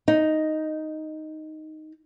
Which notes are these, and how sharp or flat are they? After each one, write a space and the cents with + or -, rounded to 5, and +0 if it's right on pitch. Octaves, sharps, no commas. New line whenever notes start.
D#4 +0